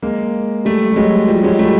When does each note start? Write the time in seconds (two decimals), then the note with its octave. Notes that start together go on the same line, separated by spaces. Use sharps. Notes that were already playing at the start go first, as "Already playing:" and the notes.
0.02 G#3 A#3
0.65 G3 A3
0.92 G3
0.96 F#3 G#3
1.28 F3 G3
1.43 F#3 G#3
1.59 G3 A3